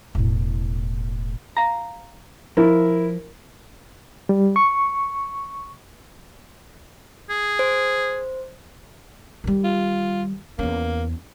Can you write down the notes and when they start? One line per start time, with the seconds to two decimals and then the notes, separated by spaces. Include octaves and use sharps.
0.15 E1 A2
1.57 F5 A#5
2.57 F3 E4 A#4
4.29 G3
4.56 C#6
7.30 G#4
7.59 C5
9.44 D#3 G3
9.64 F4
10.59 E2 A#3 C#4